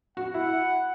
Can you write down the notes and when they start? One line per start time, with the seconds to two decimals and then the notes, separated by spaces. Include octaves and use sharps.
0.17 F#4 F#5
0.34 E4